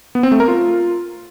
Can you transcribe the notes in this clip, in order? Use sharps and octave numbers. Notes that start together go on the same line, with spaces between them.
B3
C4
A3
A#4
F4